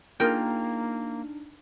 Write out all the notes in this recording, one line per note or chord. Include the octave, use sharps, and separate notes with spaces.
A#3 D4 D#4 F4 G#4 A#4 G5 F6